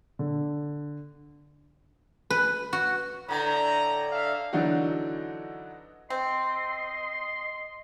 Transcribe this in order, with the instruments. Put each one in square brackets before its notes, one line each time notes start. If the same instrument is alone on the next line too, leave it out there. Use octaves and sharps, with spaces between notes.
[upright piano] D3
[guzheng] B4
F#4
[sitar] A2 D3 [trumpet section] A#5
[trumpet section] A4 E5 F5
[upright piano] D3 E3 F#3 D4 D#4 F#4
[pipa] C4 [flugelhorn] D#5 [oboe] C6